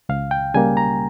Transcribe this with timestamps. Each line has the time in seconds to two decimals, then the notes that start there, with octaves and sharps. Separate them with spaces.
0.09 C#2 F5
0.31 G5
0.54 C#3 G3 A#3 G#5
0.77 A#5